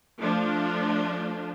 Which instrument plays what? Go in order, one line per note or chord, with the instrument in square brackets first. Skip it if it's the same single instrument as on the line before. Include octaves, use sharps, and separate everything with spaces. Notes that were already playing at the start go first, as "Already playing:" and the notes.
[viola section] F3 A3 D4